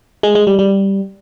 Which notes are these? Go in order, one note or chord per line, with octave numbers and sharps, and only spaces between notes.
G#3
G#3
G3
G3